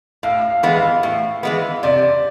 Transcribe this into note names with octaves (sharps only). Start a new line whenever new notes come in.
A2 F5
F5
E3 G#3 B3
F5
A2
E3 G#3 B3
C3 D5